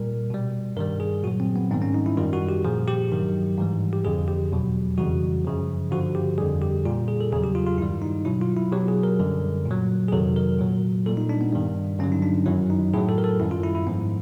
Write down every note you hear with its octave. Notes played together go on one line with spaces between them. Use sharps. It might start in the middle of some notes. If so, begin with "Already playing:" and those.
Already playing: A#2 G3 A#4
B2 G3
G2 D#3 G3 A#4
G#4
A#2 F#3 F#4
C4
B3
G#2 D#3 G3 C4
C#4
D#4
E4
F#2 D#3 G3 F4
F#4
G4
A#2 F3 G#4
G4
G2 D#3 F#3
G#2 E3 G3
G4
F2 D3 F3 G#4
G4
E2 B2 F#3
F2 C#3 E3 G3 F#4
F#2 C#3 F3
G2 D3 F3 F#4
G4
F2 D3 G3 G#4
G4
A#2 G3 F4
G#4
A4
E2 C#3 F#3 G#4
G4
F4
F4
G2 D#3 G3 E4
D#4
B2 F#3 E4
F4
E4
B2 F#3 G4
G#4
A#4
F#2 D3 G3
A#2
F#3
G#4
F2 C3 D#3 F#3 A4
A#4
A#2 F#3
A#2 G3 A4
D#4
D4
B3
G2 D#3 G3
G2 D3 F#3 C#4
D#4
D4
F#2 D#3 F#3 E4
D#4
A2 F#3 G#4
A4
A#4
A4
F#2 D#3 G3 E4
F4
E4
E4
G#2 F3 B3